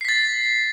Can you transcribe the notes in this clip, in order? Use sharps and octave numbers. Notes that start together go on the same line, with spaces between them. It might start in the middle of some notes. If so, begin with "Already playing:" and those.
A6 B6 C7